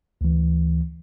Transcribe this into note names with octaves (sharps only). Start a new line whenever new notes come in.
D2 E3